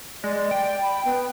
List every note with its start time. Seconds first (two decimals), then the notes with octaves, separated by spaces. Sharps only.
0.24 G#3 D5
0.51 G5
0.82 B5
1.05 B3